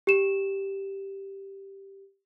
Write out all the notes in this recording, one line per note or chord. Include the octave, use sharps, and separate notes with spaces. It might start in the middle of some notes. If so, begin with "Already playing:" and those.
G4 E7